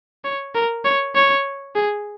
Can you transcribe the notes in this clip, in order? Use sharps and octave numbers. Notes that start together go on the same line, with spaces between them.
C#5
A#4
C#5
C#5
G#4